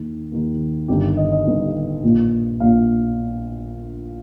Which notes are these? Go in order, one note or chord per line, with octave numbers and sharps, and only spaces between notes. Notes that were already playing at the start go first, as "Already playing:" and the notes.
Already playing: D#2 D#3
D#2 D#3
G1 G2 D#3 G4
D#5
D#5
G1 G2 D#3
A#1 A#2
A#1 A#2 F5